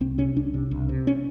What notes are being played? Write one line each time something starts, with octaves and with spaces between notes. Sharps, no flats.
C2 C4
C3 C#4
C2 D4
C3
C2
C3
C#4